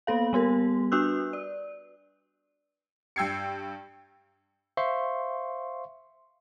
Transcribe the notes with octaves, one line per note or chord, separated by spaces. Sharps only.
A#3 B3 A4 F5
G3 B3 G4 A#4
D4 F#4 B4 E6 F#6
D5
G2 G5 E6 G#6 C7 C#7
C5 E5 F5 C6 C#6